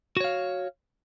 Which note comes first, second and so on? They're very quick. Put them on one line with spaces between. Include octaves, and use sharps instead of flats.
F#4 C#5 F5